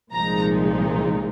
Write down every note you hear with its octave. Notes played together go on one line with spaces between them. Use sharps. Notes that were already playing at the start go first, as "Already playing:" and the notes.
C2 A#2 F3 G#3 D#4 A#5